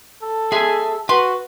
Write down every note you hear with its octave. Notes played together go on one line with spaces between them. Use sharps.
A4
G#3 G#4 E5 G#5
F#4 B4 C6